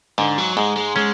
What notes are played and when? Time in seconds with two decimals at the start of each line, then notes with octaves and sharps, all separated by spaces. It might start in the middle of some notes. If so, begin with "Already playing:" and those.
0.18 G#2 D3
0.38 F#3
0.57 G#2 G#3
0.76 G#3
0.96 G#3 C#4